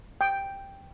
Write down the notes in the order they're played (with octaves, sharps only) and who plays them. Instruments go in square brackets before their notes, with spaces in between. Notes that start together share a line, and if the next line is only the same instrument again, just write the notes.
[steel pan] G5